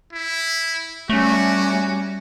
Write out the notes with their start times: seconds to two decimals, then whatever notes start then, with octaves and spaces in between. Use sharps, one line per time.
0.13 E4
1.09 G3 A3 C#4 F#4